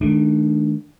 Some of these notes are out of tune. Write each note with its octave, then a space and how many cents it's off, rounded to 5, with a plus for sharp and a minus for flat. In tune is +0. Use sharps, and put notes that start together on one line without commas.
D#3 +0 A3 -40 D4 +0